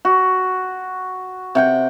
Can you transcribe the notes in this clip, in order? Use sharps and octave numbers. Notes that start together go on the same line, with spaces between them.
F#4
C3 F#5 G5